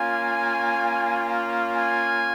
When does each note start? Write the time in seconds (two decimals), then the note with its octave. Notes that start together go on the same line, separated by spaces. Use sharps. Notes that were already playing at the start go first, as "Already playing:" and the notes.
Already playing: A#3 C#4 F4 G#5
1.75 G#5